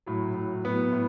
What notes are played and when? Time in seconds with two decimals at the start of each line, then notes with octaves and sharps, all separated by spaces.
0.06 A2 F#3
0.34 A2 F#3
0.65 A2 F#3 B3
0.93 A2